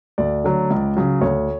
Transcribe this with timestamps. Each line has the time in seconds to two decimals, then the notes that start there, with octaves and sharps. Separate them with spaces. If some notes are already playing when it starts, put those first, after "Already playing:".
0.18 D2 D5
0.44 D3 F#3 A3
0.70 C#2
0.97 C#3 F#3
1.21 D2 C#5